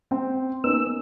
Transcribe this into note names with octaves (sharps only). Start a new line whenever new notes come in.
C4 G5
A#3 B3 C#4 D#4 E6